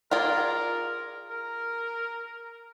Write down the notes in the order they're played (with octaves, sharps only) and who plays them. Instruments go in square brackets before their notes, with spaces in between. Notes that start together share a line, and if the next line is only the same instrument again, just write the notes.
[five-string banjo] F4 G#4 D5 [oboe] A#4
[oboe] A#4